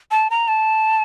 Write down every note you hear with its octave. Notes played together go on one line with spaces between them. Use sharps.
A5
A#5
A5